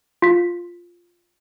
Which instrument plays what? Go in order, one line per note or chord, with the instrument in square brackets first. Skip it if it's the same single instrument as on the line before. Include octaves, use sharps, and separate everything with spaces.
[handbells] F4 B6